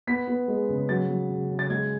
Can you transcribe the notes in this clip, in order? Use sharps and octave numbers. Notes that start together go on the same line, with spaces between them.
B3 B6
B3
G#3
C#3
F#3 A6
F#3
C#3
C#3
A6
G#3 G#6